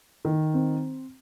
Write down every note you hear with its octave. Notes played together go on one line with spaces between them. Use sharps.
D#3
C4